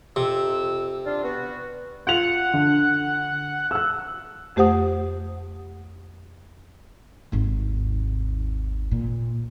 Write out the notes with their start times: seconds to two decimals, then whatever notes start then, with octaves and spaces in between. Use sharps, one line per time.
0.16 F2 C3 E6
1.06 D4 F4
1.23 B3 F#4
2.07 F4 F#5 F7
2.54 D3
3.71 E6 F#6
4.56 F2 A3 G4 C5 F#5 D#6
7.32 G#1 D#2
8.91 A#2